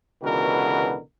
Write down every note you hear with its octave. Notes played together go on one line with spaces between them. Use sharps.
C#2 B2 D3 E3 F#4 A#4